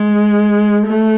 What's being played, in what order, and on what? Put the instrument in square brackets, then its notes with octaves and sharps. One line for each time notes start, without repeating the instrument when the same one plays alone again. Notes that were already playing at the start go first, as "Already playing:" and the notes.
Already playing: [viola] G#3
A3